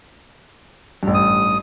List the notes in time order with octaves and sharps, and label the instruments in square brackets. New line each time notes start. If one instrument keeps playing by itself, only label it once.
[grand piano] A1 G2
[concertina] D#6